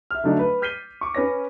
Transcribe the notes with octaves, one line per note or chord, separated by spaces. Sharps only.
E5 F6
D3 F#3 A3 D4 D#4
B4
F6 G6 B6 C7 D#7 G7
C#6 D6
C#4 B4 C#5 A#6